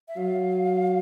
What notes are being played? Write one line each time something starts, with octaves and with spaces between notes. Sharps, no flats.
E5
F#3 F5